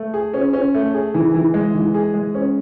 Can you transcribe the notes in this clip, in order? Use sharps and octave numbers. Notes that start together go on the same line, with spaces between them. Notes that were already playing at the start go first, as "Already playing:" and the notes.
Already playing: A3
G#4
C#4
C#4
A3
G#4
E3
E3
G#3
E3
G#4
G#3
C#4